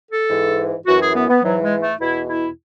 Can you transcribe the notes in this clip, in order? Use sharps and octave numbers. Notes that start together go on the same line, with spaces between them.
A4
G#2 E3
F#2 E3 F#4
G#4
B3
B3
G#2 E3 F#3
G#3
A3
E2 B2 E4
E4